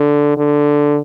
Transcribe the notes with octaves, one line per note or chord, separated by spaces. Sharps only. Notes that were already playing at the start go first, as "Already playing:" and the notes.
Already playing: D3
D3